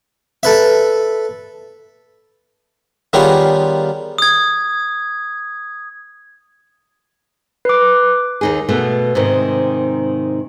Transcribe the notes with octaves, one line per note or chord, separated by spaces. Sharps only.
A4 B4 E5
D#3 G3 B3 F4 G#4 C#5
D#6 G#6
B4 D6
D#2 D#4 G#4
B2 A3 B3
G#2 C3 D#3